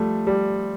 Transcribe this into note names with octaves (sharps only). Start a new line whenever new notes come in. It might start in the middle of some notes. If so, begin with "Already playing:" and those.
Already playing: F3 G3 A3
G3